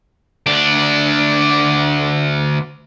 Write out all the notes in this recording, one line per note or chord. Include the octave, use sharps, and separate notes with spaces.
D2 D4